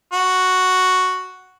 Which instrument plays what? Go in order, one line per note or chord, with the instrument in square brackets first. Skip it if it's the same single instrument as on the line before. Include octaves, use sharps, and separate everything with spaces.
[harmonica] F#4